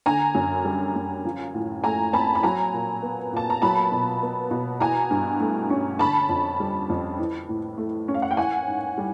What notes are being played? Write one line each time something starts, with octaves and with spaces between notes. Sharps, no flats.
D3 G#5 A#5
F#2
G3
F#2
F3
A2
A3 G#5 A#5
C4 A5 B5
B5
F#3 G#5 A#5
A#2
B3
A#2 A5
A#5
F#3 A5 B5
B2
B3
B2
E3 G#5 A#5
G2
A3
C#4
D3 A5 B5
F2
G3
F2
E3
A2
A3
C#4
F5
F#5
G5
E3 F#5 G#5
G#2
G3